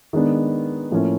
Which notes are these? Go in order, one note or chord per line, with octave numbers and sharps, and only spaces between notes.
D#3 G#3 B3 D4
A2 F3 A#3 C#4 E4